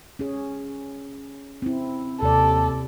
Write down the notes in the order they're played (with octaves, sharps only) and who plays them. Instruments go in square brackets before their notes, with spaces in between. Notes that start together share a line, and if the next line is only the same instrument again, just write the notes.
[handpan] C#4 G#4
C4 E4
[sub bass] D#2 [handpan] C3 D5 [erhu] A4